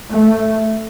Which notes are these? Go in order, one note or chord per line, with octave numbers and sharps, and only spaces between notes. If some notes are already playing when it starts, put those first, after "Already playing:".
A3